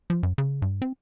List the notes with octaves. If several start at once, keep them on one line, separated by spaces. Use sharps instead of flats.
F3
F#2
C#3
G2
C4